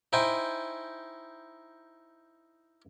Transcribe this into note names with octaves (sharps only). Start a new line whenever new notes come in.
D#4 E4 C5 G5 G#5